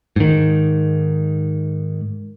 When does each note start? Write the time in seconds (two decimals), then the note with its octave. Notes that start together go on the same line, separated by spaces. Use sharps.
0.16 G#2 D#3